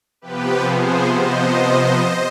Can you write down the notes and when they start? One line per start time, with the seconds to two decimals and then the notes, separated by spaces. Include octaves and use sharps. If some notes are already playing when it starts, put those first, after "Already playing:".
0.22 C3 F3 B3 G4 B4
0.66 G#4 C5
1.11 C5 D#5